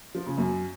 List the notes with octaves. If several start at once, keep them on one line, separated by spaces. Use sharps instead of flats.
F3
C#3
F#2